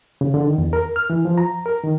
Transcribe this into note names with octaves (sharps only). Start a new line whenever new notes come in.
C#3
D3
D#3
E2
A#4
F6
E3
F3
A#5
A#4
D#3